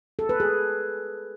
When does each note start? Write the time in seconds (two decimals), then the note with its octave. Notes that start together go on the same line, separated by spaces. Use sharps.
0.19 A4
0.29 B4
0.40 G#4